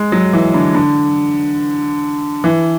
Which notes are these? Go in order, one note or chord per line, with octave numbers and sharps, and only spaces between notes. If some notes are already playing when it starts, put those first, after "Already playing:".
Already playing: G#3
F#3
E3
D3
D3
E3